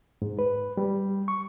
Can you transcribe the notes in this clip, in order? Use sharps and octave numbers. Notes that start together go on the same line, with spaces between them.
G#2
B4
G3
C#6